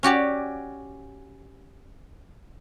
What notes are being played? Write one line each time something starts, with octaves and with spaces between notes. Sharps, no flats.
C#4 F#4 G4 D5